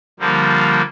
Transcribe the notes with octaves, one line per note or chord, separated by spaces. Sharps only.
D3 F3 G3 A#3